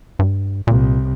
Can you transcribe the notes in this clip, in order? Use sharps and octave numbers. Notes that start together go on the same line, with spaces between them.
G2
C2 A#2